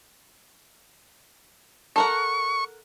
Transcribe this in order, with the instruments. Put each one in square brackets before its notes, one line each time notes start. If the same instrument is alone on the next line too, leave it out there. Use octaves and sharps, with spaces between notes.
[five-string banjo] A4 A#4 F#5 [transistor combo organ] C#6